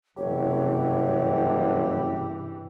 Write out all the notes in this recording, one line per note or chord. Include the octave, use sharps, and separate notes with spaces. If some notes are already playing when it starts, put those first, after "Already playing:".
F#1 G2 C3 E3 G4 C#5